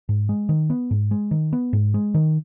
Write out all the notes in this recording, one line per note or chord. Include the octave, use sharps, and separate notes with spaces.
G#2
G#3
D#3
B3
G#2
G#3
D#3
B3
G#2
G#3
D#3